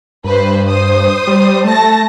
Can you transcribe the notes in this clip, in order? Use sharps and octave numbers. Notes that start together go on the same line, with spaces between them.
G2 B4 C5
C5 D#6
G3
A3 A5 A#6